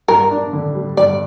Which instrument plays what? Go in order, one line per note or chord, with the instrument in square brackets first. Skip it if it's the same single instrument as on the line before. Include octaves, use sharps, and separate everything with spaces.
[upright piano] G2 [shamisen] A#4
[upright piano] D4
D3
G3
[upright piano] G2 [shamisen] D5